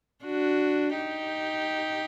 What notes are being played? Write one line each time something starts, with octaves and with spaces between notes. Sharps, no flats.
D4 F#4
D#4 G4